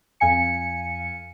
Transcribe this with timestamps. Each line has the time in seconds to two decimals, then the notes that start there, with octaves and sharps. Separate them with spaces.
0.20 F2 F5 G#5 C#7